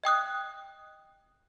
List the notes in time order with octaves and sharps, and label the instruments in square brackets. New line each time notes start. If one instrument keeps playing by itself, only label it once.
[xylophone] D#5 G5 D#6 F#6